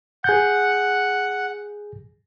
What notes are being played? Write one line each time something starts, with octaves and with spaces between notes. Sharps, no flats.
G#4 F#5 G6